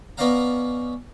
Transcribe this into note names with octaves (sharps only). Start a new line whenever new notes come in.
B3 C#4 D5 D#5 F5 A#5